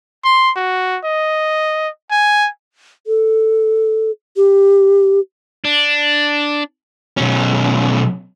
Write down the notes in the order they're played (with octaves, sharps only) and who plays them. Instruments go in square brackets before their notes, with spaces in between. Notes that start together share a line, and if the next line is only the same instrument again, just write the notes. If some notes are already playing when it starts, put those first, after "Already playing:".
[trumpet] C6
F#4
D#5
G#5
[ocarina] A4
G4
[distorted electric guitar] D4
[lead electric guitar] B1 C#4